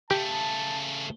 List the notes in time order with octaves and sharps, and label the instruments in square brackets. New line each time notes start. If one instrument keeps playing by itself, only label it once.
[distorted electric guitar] C#3 A3 [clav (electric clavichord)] G4 [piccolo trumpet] A5